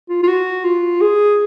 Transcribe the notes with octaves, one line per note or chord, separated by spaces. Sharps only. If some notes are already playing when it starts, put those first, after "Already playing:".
F4
F4
F#4
F4
G#4